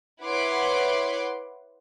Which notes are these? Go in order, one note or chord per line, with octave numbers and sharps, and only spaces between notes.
E4 B4 C#5 F#5 C6 D6